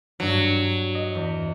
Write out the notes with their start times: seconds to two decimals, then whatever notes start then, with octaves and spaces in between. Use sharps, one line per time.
0.20 G2 F#3 G#6
0.95 D#5
1.15 E2